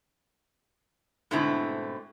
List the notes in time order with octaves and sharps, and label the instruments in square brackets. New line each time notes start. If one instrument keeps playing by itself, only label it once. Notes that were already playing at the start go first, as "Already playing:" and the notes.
[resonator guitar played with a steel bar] G#2 B2 D3 A3 C4 E4